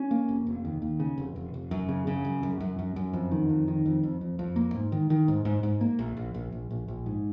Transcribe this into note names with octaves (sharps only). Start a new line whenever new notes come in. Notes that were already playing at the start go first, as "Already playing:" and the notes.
Already playing: C#4
A#3
F1
F1
D#2
D#2
C#3
F1
F1
F1
F#2
C#3
C#3
F#2
F#2
F#2
F#2
F#2
F2
D#3
F2
D#3
F2
F2
F2
F2
A#3
G#2
D#3
D#3
G#2
G#2
G#2
A#3
A#1
A#1
A#1
A#1
A#1
A#1
G#2